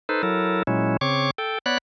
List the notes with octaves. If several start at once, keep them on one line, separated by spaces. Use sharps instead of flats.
D#4 A4 B4 C5
F#3 E4 A4 A#4
A#2 F#3 G#3 C#4 E4
C#3 C4 C#5 C#6 D6
A4 G5
B3 C#5 D5 B5 F#6